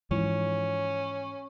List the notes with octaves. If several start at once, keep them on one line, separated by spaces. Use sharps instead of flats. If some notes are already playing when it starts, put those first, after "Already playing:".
G#2 E3 F3 C#4